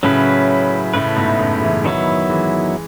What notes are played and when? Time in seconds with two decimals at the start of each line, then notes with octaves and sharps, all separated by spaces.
0.03 A2 C#3 F#3 C#4 E4 B4
0.94 A2 C#3 A3 E4 B4
1.16 G#2 B2
1.39 F#2 A2
1.62 C#3 E3
1.85 D#3 F#3 B3 E4
2.30 E3 G#3